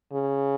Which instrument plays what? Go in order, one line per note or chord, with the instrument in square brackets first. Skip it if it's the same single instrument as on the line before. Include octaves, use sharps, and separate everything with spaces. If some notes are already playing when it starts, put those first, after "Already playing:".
[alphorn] C#3